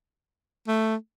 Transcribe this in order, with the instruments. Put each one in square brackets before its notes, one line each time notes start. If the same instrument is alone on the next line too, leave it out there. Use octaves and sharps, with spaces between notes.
[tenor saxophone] A3